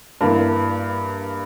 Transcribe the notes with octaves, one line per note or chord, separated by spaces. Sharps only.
G2 E3 A#3